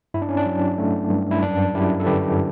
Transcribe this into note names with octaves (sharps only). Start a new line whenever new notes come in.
G2 E4
D4
C#4
D4
F#3
A3
G2
E4
F#2 D4
F#2 E4 G4
A4
D3 G4 B4